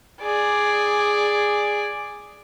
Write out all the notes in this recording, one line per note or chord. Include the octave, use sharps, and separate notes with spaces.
G#4 D5